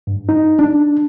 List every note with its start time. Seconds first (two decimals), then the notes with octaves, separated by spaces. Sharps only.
0.07 G2
0.29 D#4
0.59 D4